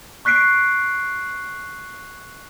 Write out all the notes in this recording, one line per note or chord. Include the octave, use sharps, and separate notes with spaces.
C#6 F#6 B6 C7 D7